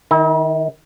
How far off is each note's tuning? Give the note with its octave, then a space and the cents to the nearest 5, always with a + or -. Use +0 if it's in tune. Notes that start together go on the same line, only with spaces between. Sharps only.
D#3 +0 E4 -45 A#5 +0